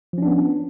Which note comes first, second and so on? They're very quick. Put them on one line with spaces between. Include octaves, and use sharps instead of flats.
F3 C#4 D4 B3